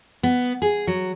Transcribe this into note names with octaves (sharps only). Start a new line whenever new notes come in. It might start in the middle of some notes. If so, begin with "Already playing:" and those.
B3
G#4
F#3